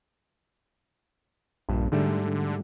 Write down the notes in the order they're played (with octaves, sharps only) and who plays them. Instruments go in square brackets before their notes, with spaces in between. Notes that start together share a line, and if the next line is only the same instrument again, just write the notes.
[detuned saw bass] A#1 [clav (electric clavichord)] G2
[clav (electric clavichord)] G#2 G3 A3 [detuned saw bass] D3